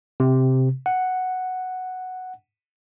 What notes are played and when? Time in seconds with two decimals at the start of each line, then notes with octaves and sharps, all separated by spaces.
0.20 C3
0.86 F#5